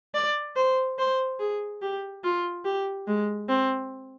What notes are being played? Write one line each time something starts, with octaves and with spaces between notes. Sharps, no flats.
D5
C5
C5
G#4
G4
F4
G4
G#3
C4